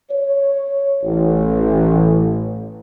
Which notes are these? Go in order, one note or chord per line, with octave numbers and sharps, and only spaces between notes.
C#5
A1